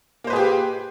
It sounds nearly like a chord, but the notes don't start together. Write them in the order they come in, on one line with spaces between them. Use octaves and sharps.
A#3 C5 B4 G#4 G4